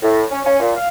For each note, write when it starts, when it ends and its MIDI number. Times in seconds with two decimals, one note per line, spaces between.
0.02 0.23 45
0.31 0.39 61
0.45 0.56 61
0.60 0.73 46
0.76 0.88 77